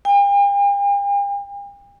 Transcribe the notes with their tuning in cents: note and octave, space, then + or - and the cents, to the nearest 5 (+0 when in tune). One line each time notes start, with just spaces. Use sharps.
G5 +45